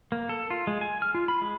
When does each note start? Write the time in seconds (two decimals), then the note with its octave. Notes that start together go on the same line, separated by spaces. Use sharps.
0.12 A#3
0.29 A4
0.50 F4
0.67 G#3
0.81 G#5
1.02 F6
1.15 F4
1.28 B5
1.42 G#3